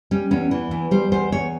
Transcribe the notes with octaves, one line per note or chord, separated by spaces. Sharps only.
G3 C#4
E2 C#4
E3
E2
G3 C5
E2 C5
E2 C#5